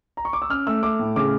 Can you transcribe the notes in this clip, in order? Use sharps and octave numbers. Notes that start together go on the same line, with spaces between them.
A#5
C#6
D6
E6
C#4 F6
A3 E6
A3 D6
A2
C#3 D6